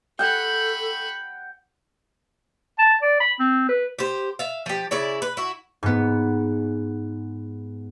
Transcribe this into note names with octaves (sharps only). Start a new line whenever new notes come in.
A4 F#5 G5 B5 C#6
A5
D5
B5
C4
B4
G4 C5
E5 F5
F3 G4
C#3 E4 D5
B4
E4 F#4
G#2 B3